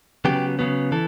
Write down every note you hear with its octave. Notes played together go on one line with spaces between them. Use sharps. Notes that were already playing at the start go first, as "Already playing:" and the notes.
C#3 F#3 B3 G4
C#3 F#3 B3
E3 A4